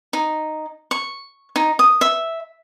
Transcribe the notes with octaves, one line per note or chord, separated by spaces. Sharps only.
D#4
C#6
D#4
D#6
E5